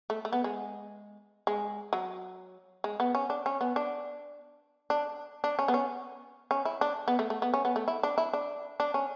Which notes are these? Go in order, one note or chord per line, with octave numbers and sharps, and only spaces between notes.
A3
A3
B3
G#3
G#3
F#3
G#3
B3
C#4
D4
C#4
B3
D4
D4
D4
C#4
B3
C#4
C#4
E4
D4
B3
A3
A3
B3
C#4
B3
A3
E4
D4
E4
D4
D4
C#4